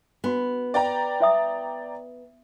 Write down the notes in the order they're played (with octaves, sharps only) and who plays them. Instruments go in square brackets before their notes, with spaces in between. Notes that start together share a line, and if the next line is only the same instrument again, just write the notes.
[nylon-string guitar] B3 [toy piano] D4 F#4
[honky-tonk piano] D5 G5 A#5
[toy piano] E4 E5 D#6